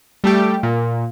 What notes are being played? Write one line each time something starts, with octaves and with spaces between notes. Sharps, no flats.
G3 A3 G4
A#2